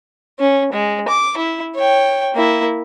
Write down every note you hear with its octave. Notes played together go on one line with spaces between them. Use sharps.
C#4
G#3
D6
E4
C#5 G5
A#3 E4